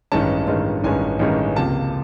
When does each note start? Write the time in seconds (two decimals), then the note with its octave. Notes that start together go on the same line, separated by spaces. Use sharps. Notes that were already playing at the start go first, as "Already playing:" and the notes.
0.12 A1 G2 D#3 G#3 C#4 A5
0.47 A1 G2 D#3 G#3 C#4
0.84 A1 G2 D#3 G#3 C#4 G#5
1.19 A1 G2 D#3 G#3 C#4
1.56 C#2 C3 F3 A#3 A5